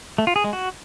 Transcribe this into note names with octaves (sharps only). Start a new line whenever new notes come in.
A3
F4
G#4
G#3
F#4